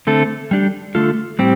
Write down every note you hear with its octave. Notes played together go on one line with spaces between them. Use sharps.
D3 A3 C4 A4
G3 D4 G4
D3 A3 F4 A4
A2 G3 C4 G4